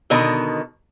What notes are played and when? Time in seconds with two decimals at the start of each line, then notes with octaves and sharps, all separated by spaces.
0.10 B2 D3 D#3 D#5